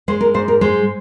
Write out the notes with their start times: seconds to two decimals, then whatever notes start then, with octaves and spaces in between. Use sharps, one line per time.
0.08 G#3 C5
0.21 A#4
0.34 G#2 C5
0.48 A#4
0.61 G#3 C5